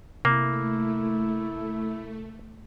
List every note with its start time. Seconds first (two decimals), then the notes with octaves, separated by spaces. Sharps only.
0.25 C3 A3 A#3 E4